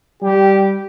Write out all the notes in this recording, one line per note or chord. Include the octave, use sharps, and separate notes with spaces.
G3 G4